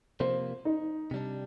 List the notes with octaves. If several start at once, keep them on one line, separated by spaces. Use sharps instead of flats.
C3 F3 A#3 C5
D#4
C3 G3 D4